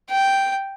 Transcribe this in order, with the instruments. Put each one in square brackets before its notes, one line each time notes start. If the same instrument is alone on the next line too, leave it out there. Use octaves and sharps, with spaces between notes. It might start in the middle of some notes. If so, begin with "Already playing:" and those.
[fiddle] G5